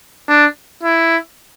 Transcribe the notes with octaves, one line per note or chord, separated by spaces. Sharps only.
D4
E4